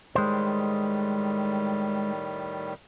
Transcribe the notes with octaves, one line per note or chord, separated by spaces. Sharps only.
A2 D#3 G3 G#3 C5